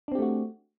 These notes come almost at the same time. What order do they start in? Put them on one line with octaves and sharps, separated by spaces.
D4 C4 G4 A3 F#4